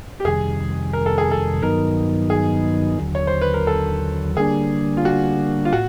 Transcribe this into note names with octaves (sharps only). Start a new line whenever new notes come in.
G4
F2 C3 D#3 G3 G#4
A#4
A4
G#4
A4
G2 D#3 F#3 B3 D#4 A#4
G#4
D#2 D3 F#3
C#5
C5
B4
A#4
A4
D3 G3 A#3 D4 G#4
F4
F#4
F4
A2 F#4